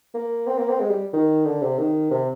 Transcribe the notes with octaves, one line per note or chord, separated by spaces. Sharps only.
A#3
C4
A#3
C4
G#3
G3
D#3
D3
C3
D#3
C3